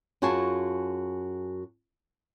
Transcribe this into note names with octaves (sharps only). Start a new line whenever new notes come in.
F#2 F4 F#4 G#4 G#5 A5